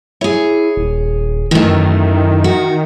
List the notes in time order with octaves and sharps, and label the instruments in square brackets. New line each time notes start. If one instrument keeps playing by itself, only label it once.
[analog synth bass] E4 [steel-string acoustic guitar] G#4 C#5
[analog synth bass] D#1
[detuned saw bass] D#3 [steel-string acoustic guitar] E3 A3
[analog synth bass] F#2
[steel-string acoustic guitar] F#4